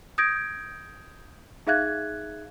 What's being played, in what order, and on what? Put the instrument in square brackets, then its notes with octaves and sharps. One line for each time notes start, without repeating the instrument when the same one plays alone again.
[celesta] D#6 G6 G#6 A#6 D7
D#4 G#4 E5 F5 F#6 G#6